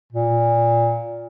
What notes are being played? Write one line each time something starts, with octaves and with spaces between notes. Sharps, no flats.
A#2